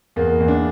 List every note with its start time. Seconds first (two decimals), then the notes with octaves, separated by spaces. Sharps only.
0.16 E2 A#3
0.40 E2
0.48 D4